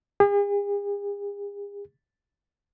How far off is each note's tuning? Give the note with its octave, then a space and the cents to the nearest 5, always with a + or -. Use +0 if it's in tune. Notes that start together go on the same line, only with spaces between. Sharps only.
G#4 -45